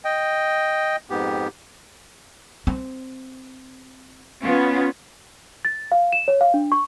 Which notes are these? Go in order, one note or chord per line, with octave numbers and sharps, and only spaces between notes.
D#5 G5
F2 G#2 B3 G4
C4
B3 C#4 F4
A6
F5
E7
C#5
F5
D4
C#6